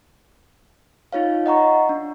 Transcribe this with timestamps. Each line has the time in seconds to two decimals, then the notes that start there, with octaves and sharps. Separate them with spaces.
1.13 D#4 F4 C#5 F5
1.46 D#5 F#5 A#5 C#6
1.89 D4